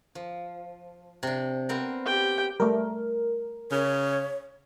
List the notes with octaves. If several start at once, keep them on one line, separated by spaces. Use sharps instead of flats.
F3
C3 D4
B3 C4 A#4
G4 G5
G3 A3 A#4
C#3 C#5